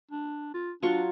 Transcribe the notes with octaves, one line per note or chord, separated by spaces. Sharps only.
D4
F4
F#3 D4 F4 C#6